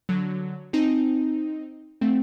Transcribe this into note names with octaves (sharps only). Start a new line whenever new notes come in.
D3 F#3
C4 D#4
A3 C4